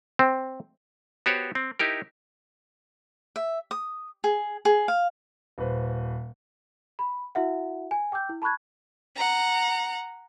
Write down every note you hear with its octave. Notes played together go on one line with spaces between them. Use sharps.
C4
B3 F#4 G4 C5 C#5
C4
D#4 E4 G4 A#4
E5
D#6
G#4
G#4
F5
D#1 B4 C5
B5
E4 F#4 E5 F#5
G#5
G5 D6 E6 G6
E4
A5 B5 C#6 F#6 G#6
F#5 A#5